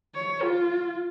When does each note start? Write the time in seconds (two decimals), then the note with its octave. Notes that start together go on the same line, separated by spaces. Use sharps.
0.15 C#5
0.43 F4